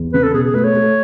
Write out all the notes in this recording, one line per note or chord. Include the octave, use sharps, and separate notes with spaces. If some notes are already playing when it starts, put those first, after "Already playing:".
Already playing: E2
C#3 B4
A4
B2 G#4
G#4
A3 B4
C#5
A3